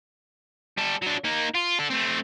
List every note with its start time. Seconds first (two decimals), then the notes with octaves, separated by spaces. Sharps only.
0.77 G3 A4
1.02 F#3 D4
1.24 A#3 D#4
1.54 F4
1.79 D4 A4
1.90 A3 C4